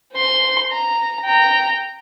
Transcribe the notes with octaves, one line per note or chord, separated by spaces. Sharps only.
C5 C6
A#5
G5 A#5